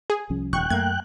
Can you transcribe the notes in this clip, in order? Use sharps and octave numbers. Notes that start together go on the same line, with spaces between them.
G#4
C2 F3 C#4
D#1 G5 C#6 F#6
F#2 A3 A#3 G#6